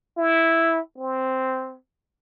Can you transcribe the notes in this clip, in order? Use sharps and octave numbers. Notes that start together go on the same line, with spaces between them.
E4
C4